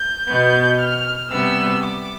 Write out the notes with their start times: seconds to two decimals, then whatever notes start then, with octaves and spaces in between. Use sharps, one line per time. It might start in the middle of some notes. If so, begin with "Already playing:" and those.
Already playing: G6
0.29 B2 B3
0.80 F6
1.31 C3 G3 B3 E6
1.82 D6